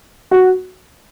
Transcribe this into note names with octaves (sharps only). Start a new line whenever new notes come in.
F#4